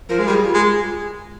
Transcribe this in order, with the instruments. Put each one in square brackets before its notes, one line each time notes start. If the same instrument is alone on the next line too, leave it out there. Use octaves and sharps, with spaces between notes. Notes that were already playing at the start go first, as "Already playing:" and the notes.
[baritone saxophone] F3 [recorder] A#4
[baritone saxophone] G#3
[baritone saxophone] G3 [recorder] G#4
[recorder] F4
[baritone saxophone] G#3